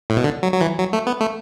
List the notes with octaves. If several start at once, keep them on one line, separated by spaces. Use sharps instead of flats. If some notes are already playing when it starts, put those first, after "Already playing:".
A2
B2
D3
F#3
F#3
E3
F#3
A3
B3
A3